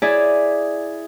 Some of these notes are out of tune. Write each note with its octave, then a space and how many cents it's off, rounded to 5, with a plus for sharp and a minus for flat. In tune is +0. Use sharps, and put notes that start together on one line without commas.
E4 +0 G#4 +0 D5 +0